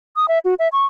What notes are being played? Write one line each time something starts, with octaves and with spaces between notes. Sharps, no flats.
D#6
E5
F#4
E5
C#6